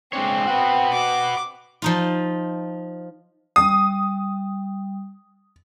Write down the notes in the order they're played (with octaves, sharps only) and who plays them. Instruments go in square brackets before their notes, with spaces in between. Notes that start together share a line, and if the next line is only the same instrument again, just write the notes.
[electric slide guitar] G#3 D4 C#5 [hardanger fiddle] C4
[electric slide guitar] F#4 B4
[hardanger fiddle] D6
[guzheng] F3 D#4 F4
[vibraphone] G3 [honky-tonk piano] D#6